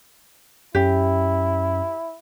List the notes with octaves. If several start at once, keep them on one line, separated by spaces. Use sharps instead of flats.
F#2 C#4 E4 G4